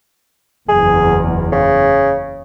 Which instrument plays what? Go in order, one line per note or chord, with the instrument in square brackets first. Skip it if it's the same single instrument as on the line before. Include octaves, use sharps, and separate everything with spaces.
[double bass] F#1 E2 [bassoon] G#4
[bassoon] C#3